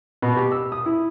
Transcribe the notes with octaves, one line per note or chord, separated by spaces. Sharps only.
B2
G4
E6
D#6
E4